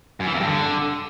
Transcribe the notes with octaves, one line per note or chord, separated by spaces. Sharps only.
F#2
E3
F2
G2
D3